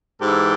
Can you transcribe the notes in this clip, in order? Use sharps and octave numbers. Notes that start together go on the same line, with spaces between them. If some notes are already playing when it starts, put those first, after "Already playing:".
G#2 E3 G4 A4